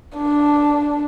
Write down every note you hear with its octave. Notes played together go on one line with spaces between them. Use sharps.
D4